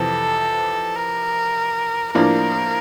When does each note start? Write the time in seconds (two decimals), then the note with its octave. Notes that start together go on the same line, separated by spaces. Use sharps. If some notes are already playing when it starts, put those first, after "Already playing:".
Already playing: F2 C3 E3 A4
0.96 A#4
2.14 A2 F3 A#3 D4 A#4